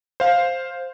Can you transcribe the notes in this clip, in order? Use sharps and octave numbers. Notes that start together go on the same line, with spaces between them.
C5 F5